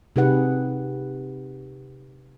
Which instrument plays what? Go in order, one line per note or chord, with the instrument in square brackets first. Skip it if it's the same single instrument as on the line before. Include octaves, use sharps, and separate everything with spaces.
[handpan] C3 D#4 G4 G#4 B4 F#5